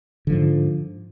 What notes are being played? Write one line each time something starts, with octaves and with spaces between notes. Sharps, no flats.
G#2 D3 F3